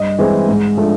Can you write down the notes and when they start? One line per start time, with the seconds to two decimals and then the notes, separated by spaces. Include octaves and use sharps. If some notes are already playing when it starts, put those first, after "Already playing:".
Already playing: G2 D#5
0.19 E3 G#3 C4
0.49 G#2
0.77 F3 A3 D4